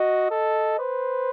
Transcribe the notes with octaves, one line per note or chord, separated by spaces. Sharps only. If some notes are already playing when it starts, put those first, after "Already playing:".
Already playing: F#4 D#5
A4 D#5
B4 C5